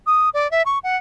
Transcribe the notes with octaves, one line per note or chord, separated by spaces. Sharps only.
D#6
D5
E5
C#6
F#5